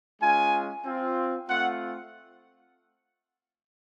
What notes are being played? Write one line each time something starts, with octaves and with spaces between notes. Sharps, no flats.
G#3 C#4 F4 G#5
C4 F4
A3 C4 F4 F#5